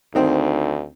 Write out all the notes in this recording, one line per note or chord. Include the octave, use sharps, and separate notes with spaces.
D2 D#3 C4